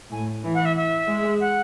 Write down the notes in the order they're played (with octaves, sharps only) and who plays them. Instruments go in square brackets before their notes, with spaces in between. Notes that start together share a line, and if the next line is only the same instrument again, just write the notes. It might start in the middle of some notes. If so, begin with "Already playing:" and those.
[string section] A2 [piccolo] G#5
[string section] E3
[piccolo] F#5
E5
E5
[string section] G#3
[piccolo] F#5